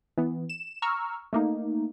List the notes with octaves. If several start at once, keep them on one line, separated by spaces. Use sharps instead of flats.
E3 B3
E7
A#5 C#6 E6 F6
A3 A#3 D#4